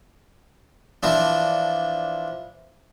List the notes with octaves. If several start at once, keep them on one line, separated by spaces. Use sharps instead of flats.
E3 F3 D4